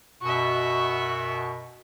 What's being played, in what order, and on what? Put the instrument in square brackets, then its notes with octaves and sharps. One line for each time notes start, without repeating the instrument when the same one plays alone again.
[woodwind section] F#2 B2 [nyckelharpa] F#4 E5 [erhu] C#6